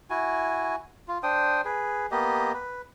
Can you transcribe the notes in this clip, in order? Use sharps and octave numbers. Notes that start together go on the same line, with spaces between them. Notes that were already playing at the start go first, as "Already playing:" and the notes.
E4 F#4 G#5
F4
D4 C5 G5 D#6
G#4 B4
A#3 B3 G4 D#5
B4